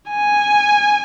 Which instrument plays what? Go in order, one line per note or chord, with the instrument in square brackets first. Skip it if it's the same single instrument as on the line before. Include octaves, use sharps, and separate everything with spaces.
[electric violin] G#5